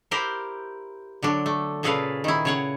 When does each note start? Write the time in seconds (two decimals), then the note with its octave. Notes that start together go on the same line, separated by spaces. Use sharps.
0.11 E4 G4 A#4 C5
1.23 D3 F#3 D4
1.46 A3
1.83 A#2 C#3 G#4 A4 B4 F5
2.24 D#3 E4
2.45 C#3 C#5 F#5